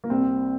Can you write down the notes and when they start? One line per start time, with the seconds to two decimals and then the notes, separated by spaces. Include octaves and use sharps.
0.04 A#3
0.10 C2 C4